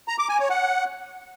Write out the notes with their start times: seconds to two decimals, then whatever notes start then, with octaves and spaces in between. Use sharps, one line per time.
0.08 A#5
0.19 D6
0.29 G#5
0.39 C#5
0.50 F#5